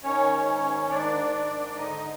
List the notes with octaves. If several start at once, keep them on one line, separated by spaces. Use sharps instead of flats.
D#3 C#4 C#5
G#2
D#3
G#2 D4 D5
D#3
G#2
D3 D#4 D#5